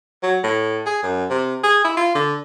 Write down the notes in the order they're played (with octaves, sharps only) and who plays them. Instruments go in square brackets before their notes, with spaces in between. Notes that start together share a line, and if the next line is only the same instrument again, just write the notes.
[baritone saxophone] F#3
A2
G#4
F#2
C3
G#4
E4
F4
D3